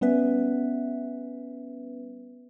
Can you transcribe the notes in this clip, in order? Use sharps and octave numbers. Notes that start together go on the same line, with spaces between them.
G3 B3 C#4 B4 E5